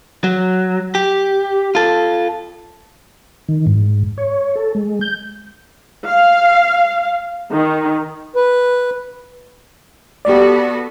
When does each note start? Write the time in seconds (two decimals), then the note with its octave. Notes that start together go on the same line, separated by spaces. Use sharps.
0.24 F#3
0.95 G4
1.75 F4 A4
3.48 D#3
3.67 G#2
4.18 C#5
4.56 A4
4.75 G#3
5.01 G6
6.06 F5
7.51 D#3
8.36 B4
10.25 B3 F#4 G4 A4 D5